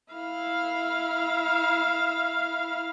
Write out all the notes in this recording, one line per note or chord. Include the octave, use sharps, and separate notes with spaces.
E4 F5